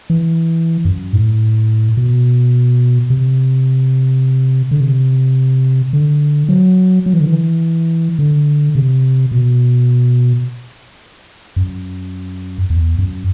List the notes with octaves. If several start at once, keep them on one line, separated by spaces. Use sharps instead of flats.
E3
F#2
A2
B2
C3
D3
C3
D3
F#3
F#3
E3
D3
E3
D3
C3
B2
F#2
E2
F#2